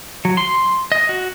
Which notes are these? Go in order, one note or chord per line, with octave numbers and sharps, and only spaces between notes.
F#3
C6
D#5
F#4